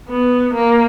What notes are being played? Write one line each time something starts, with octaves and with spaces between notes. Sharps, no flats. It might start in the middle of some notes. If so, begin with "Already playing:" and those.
B3
A#3